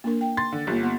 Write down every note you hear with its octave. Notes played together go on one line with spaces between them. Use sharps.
A#3 D4 A#4
G5
C6 A6
D3
G1 A#3 F4 G4
B3 F#5 C6